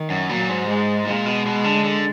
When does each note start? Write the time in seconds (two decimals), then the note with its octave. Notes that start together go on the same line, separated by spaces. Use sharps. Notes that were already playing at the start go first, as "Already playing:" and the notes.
Already playing: D#3
0.10 F#2
0.29 A#2 F#3
0.49 G#2
0.69 G#3
1.07 A#2 G#3
1.26 B2
1.46 B2
1.64 D3
1.84 D3